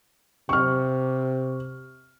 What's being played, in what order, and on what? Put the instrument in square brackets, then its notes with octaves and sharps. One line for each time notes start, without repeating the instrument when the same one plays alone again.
[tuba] C3 [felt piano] C#6 F6